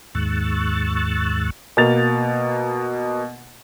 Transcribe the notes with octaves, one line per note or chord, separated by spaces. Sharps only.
D#2 G#2 C#6 E6 F#6 A6
B2 A#3 A6 F7